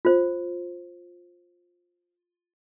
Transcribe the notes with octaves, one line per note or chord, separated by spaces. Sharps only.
F4 C5